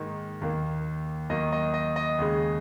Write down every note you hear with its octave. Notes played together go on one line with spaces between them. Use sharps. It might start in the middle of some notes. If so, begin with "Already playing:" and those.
Already playing: G#2 D#3 A#3
D#2 D#3 A#3
D#2 D#3 F#3 A#3 D#5
D#5
D#5
D#5
D#2 C#3 G#3